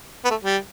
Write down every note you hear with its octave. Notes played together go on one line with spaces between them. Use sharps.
B3
A3
G3